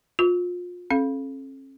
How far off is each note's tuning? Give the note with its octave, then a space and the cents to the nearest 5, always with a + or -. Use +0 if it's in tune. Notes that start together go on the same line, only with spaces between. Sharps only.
F4 +30 C#6 +45
C#4 -45 A4 -25 F5 +0